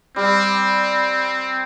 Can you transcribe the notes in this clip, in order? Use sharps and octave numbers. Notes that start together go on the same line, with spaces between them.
G3 C4